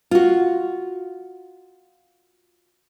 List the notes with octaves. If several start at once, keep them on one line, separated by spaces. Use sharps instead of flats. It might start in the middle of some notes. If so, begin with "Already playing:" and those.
F4 F#4